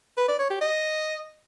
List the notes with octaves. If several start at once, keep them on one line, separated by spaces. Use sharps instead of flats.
B4
D5
C#5
G4
D#5